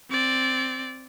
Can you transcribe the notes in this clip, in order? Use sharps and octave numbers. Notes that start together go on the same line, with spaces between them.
C4 D5